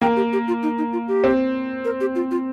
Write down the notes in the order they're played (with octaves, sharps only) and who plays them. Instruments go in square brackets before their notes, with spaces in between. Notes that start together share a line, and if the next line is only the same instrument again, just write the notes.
[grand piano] A#3 [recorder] G5
[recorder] G4
G4
F4
D#4
D#4
F4
G4
[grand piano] C4
[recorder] A#4
G4
F4
F4